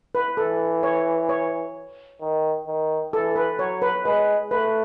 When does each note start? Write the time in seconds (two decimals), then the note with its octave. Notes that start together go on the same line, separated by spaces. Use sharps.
0.15 B4
0.37 E3 A4
0.83 C#5
1.29 C#5
2.21 D#3
2.67 D#3
3.13 E3 A4
3.36 B4
3.59 F#3 C#5
3.82 B4
4.05 G#3 B4
4.51 A3 B4